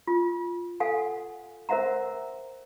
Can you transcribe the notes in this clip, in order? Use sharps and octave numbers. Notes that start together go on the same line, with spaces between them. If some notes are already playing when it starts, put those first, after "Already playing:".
F4
A4 F5 F#5 G#5
A#4 C5 E5 F#5 A#5